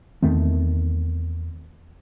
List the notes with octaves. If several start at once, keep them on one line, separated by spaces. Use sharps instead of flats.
E2 D#3 A3 C4